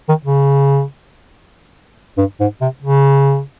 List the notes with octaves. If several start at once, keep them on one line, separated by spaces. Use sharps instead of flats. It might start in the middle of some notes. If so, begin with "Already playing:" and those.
D#3
C#3
G2
G#2
C3
C#3